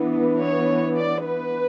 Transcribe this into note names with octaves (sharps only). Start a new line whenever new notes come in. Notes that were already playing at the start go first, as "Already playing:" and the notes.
Already playing: E3 B3 D4
C#5
D5
B4